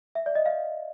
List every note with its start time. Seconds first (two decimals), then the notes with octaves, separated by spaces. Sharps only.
0.15 E5
0.26 D5
0.35 D#5
0.46 F5